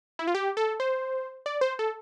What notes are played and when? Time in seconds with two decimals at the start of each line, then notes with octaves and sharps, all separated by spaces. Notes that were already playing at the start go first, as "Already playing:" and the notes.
0.19 E4
0.27 F4
0.35 G4
0.57 A4
0.80 C5
1.46 D5
1.61 C5
1.79 A4